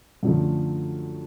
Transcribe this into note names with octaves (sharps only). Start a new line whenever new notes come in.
F#2 D3 F3 A3